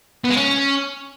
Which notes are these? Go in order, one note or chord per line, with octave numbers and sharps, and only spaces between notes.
B3
G#3
C#4